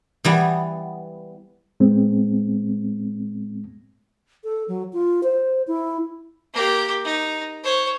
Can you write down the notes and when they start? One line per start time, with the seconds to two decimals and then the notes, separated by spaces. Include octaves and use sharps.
0.25 E3 G3 B3
1.80 A2 G#3 B3 C4
4.44 A4
4.68 F#3
4.93 F4
5.23 C5
5.67 E4
6.54 A#3 G4
7.05 D#4
7.63 C5 C#5